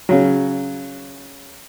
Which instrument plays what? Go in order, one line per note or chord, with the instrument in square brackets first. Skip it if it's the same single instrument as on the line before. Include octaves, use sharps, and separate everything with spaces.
[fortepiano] C#3 F#3